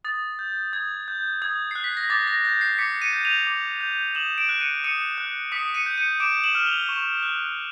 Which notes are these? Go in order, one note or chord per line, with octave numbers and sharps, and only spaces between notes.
D#6 A6
G6
D#6 G#6
G6
D#6 G#6
F#6 C7
B6
A#6
D6 A6
A#6
G6 A#6
C7
D6 B6 C#7
C#7 D#7
G6
D#7 F7
D6
G6
D#6 E7 F#7
D7 E7
F#6
C#7 D#7
D#6 C#7 D#7
F#6
D#6 B6 C#7
C#7 D#7
G6
C#7 D#7
D6 D7 E7
E7 F#7
F6
F7 G7
C#6
F#6